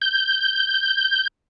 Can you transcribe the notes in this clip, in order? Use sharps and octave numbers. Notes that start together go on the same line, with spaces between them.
G6